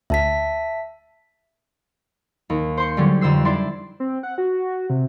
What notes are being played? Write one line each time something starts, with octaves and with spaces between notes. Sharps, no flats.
D2 E5 A5 B6
D#2
C5 C6 C#7
D3 F#3 G3 C#4
F2 D3 C5 E6 C7
D4 E4 D5 C6
C4
F#5
F#4
C3